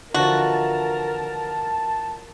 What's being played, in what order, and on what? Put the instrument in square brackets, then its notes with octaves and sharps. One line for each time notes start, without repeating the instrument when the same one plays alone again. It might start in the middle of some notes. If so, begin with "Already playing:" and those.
[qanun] D3 E3 F3 [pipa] F#4 [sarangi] A#4 [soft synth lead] A5